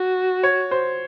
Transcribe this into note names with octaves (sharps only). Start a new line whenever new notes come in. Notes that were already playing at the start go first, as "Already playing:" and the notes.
Already playing: F#4
C#5
C5